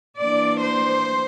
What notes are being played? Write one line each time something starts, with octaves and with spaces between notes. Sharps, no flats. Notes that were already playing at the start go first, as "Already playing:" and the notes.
E3 A#3 D4 D5
C5